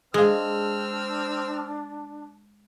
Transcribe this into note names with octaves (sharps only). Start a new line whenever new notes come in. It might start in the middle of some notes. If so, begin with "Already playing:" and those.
G#3 C4 D4 G#4 F5 E6 F6